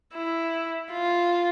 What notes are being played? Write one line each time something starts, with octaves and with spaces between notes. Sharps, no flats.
E4
F4